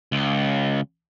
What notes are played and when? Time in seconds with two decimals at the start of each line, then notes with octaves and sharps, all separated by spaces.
0.12 C#2